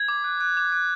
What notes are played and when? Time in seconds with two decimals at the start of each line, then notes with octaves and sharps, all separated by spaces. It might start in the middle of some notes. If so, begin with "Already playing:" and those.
Already playing: G#6
0.08 D6
0.24 F#6
0.41 F#6
0.57 D6
0.72 F#6